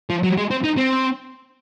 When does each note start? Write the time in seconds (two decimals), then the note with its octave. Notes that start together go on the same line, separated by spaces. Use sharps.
0.10 F3
0.23 F#3
0.37 G#3
0.50 C4
0.64 D#4
0.77 C4